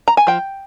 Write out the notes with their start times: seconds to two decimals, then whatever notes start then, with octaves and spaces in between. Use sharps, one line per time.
0.08 A#5
0.17 G#5
0.27 F3 G5